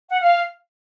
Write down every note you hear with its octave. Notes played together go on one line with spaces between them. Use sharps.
F#5
F5